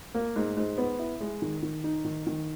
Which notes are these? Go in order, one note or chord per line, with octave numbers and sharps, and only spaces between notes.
A#3
G#2
G#2
B3
E4
G#3
D#3
D#3
D#4
D#3
D#3